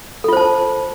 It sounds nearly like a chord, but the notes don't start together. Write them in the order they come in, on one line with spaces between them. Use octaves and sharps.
A4 F4 C5 A5